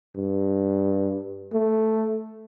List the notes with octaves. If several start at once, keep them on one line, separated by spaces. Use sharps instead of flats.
G2
A3